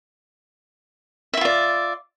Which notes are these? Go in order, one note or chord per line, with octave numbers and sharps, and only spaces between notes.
E4 F4 D5 E5